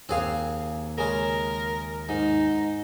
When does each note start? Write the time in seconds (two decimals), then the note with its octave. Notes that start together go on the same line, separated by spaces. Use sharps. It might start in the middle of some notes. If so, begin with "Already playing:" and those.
0.09 D#2 C4 G#4 F5
0.98 C#3 G#3 A#4
2.09 G#2 D#4